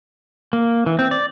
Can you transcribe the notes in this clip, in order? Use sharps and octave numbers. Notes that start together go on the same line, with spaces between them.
A#3
E3
C4
D5